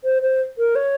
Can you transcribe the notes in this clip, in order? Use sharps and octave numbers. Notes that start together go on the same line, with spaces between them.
C5
C5
A#4
C#5